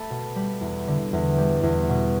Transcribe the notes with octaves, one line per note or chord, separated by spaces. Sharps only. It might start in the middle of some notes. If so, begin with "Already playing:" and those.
Already playing: A3 A5 B5
B2
G3 B5
E2
D3
E2
G3
E2
B2